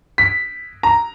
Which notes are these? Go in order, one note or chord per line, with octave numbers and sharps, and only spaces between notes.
B6
A#5